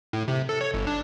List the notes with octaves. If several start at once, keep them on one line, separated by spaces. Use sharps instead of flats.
A2
C3
A4
C#5
G1
D4